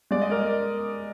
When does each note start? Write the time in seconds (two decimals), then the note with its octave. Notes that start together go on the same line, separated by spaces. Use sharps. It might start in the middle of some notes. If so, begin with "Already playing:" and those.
0.11 G#3 D5
0.22 D#5
0.30 A#4 D5